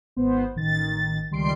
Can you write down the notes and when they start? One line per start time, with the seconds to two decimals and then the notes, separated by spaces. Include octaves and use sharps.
0.16 G#1 B3 C5
0.55 A1 D#3 A6
1.31 C#2 D#3 G3 C6 C7 D7